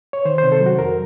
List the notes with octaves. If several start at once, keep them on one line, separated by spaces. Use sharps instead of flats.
C#5
D#3 C5
C5
C3
A4
F#3
F#4
F2 A#4